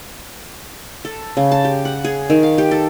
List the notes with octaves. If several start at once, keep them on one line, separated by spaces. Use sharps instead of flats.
A4
C#3
A5
G4
F#5
G#4
D#3
F5
G4
A4